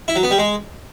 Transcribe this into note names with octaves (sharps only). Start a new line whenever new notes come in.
E4
F#3
B3
G3
G#3